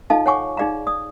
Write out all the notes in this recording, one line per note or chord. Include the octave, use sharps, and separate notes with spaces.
D#4 F4 A4 D#5 F5 A5
C#5 F#5 G#5 C#6 D6
D#4 G#4 D5 F5 A#5
D5 D#6